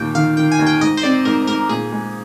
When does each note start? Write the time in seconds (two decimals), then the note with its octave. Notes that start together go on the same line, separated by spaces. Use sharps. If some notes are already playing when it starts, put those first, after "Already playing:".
Already playing: D#2 A#2 G5
0.15 D#3 F5
0.37 D#3 G5
0.52 G#5
0.59 D#2
0.66 G5
0.81 G#2 D#5
0.97 C5
1.03 C4 D5
1.25 G#2 A#4
1.47 G#2 A#4
1.69 A#2 G#4
1.92 G#3